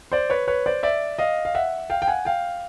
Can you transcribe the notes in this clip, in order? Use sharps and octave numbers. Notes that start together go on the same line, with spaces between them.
C5 D5
B4 C#5
B4 C#5
C5 D5
D5 E5
D#5 F5
F5
E5 F#5
F5 G5
G5
F#5 G#5
F5 G5